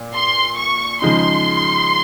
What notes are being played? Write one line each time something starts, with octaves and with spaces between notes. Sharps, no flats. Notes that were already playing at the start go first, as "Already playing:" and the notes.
Already playing: A#2
C6
C#6
C#3 F3 G#3 D#4 C6